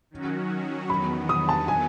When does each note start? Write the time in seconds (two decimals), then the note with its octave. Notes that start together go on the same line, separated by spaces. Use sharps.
0.11 D#3 F#3 C#4 F#4
0.89 E2 D#3 F#3 B3 B5
1.29 D#6
1.49 A5
1.68 G#5